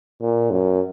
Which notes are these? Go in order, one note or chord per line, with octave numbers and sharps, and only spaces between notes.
A#2
F#2